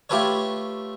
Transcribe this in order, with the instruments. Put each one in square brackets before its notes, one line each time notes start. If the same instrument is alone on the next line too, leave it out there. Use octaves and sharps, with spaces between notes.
[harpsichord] A3 F4 G4 A4 B4 C#5